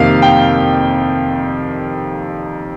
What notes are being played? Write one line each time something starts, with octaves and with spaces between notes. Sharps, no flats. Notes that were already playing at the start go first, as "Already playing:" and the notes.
Already playing: F2 C3 D#3 A#3 F5
G5